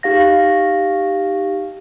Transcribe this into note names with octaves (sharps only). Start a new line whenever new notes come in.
D#4 G4 F5 A#6